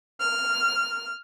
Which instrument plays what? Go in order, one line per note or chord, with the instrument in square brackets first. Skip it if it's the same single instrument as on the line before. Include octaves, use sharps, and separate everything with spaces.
[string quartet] F6